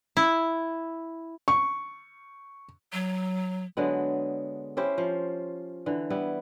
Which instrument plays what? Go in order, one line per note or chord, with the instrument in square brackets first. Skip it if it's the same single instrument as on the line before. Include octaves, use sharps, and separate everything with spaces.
[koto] E4
[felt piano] C#6
[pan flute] F#3
[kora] D3 F#3 G#3 B3
C#4 E4 G4 C5
F3
D3 E3
G3 B3 E4